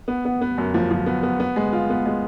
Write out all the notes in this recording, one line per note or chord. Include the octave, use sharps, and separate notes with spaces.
B3
B3
B3
F#2
F3
F3
B3
B3
B3
G#3
F4
B3
G#3